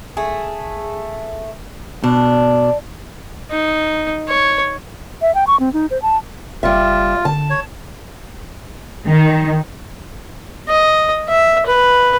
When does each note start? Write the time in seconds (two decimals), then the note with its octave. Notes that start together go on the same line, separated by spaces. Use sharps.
0.17 A3 G#4
2.04 B2 D4
3.51 D#4
4.28 C#5
5.22 E5
5.35 G5
5.47 C#6
5.60 C4
5.73 D#4
5.91 C5
6.02 A5
6.63 F#1 G3 F4 E5
7.25 D3 A5
7.50 C#5
9.06 D#3
10.68 D#5
11.29 E5
11.66 B4